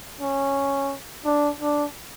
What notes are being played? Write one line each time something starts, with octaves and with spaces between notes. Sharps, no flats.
C#4
D4
D4